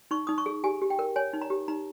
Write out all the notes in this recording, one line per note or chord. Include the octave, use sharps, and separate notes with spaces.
D#4 C#6
D#4 D#6
C#6
G#4
G4 G#5
G4
G5
A#4
C#5 G#5
D#4
A#5
G4
D#4 A#5